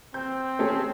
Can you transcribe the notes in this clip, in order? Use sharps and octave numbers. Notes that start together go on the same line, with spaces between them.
C4 G6
A3 C#4 G#4